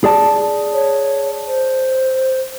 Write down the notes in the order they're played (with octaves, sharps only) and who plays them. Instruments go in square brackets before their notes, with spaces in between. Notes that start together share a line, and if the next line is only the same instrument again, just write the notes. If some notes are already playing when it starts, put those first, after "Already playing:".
[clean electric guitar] G#4 D5 A5
[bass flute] C#5
C5